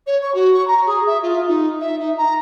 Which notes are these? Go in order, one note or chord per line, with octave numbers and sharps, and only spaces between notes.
C#5
C#6
F#4
C#6
A#5
G#4
E5
F4
D#4
E5
D#4
A#5